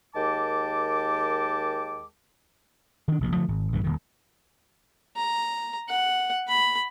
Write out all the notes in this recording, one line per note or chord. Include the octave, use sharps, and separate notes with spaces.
D#2 G#3 A#4 G5 A5 D6
D#3 D4
F1 A#1 B2
D3 F3 F#3 A3
G#1
A#1 G2 D3 E3
D#1 D#3
A#5
F#5
B5